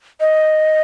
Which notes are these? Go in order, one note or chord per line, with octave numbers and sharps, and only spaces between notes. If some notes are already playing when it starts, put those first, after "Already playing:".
D#5